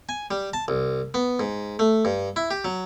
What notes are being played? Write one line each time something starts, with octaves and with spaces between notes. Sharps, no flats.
G#5
G3
A5
C2
B3
G#2
A3
G2
E4
G4
F#3